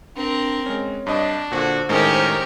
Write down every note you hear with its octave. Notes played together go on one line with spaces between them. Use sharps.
C4 D4 A#4
G#3 C#4 C#5
G2 D4 D#5
A#2 D3 F#4 C5
A2 D#3 G#3 C#4 G4 A#4